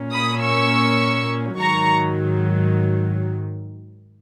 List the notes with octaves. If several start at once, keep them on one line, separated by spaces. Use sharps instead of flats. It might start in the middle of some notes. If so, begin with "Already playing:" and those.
Already playing: A#2 A#3 C#4
B5 D#6
C#6 E6
G#2 D#3 F#3 A#5 C#6